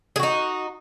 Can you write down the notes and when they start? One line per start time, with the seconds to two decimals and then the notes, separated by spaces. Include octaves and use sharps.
0.16 G#4
0.19 F#4
0.23 D#4